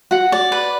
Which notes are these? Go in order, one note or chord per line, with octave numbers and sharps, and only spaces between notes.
F#4 F#5
D5
B4